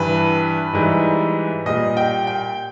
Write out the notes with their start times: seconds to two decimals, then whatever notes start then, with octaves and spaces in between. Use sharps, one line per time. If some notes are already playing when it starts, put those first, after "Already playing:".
Already playing: G2 E3 G3 B4
0.73 G#2 E3 G3
1.66 A#2 G3 D#5
1.97 G5
2.27 G5